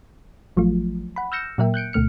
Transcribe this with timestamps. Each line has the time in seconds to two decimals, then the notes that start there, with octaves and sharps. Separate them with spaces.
0.57 A1 F3 F#3 A3 F4
1.16 F#5 B5
1.32 E6 F6 G6 A#6 C#7 E7
1.58 A#2 F#3 A#3 A#4 E5 G5
1.74 F#6 G6 C#7 D7
1.93 D2 B2 A3 F6 C#7